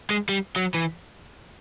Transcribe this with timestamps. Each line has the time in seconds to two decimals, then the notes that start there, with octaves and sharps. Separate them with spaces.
0.10 G#3
0.29 G3
0.56 F#3
0.74 E3